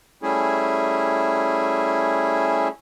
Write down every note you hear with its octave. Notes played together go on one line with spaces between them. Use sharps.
G3 A3 C#4 E4 G#4